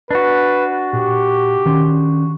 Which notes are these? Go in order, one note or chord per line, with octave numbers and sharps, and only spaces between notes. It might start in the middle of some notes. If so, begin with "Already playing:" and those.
D4 F#4 B4
A#2 G4
D#3 C#4 C6